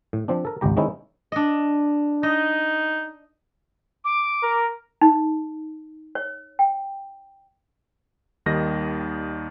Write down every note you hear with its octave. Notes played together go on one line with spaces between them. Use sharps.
A2
F3 C4 D4
A4 A#4
G#1 C#2 G4 A#5
D#3 G#3 C4 C#4 D#4 E4
D4 D#5
D#4 D#5
D6
A#4
D#4
C#5
G5
D#2 D#3 G3 D#5 A#6